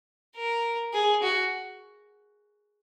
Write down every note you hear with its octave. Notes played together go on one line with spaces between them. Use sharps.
A#4
G#4
F#4